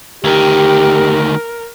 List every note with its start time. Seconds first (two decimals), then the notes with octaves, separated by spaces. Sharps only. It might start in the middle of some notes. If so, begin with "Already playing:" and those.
0.24 D2 D#3 G4 A#4